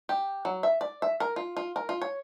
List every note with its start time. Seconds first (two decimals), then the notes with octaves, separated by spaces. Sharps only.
0.09 G4
0.45 F#3
0.63 E5
0.81 D5
1.02 E5
1.20 A#4
1.36 F4
1.57 F4
1.76 A#4
1.89 F4
2.02 C#5